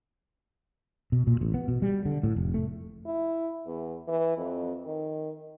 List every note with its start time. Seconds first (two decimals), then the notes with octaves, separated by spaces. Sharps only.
1.12 B2
1.27 A#2
1.41 A1
1.54 B3
1.68 B2
1.82 G3
2.06 D3
2.23 A2
2.36 F1
2.54 A3
3.06 E4
3.66 E2
4.08 E3
4.37 F2
4.85 D#3